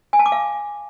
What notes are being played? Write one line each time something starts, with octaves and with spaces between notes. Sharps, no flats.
G#5
A5
D6
F5